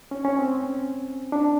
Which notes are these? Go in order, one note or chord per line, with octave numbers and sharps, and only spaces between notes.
C#4
C#4
C4
D4